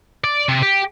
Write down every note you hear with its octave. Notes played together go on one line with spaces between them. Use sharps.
D5
C3
G4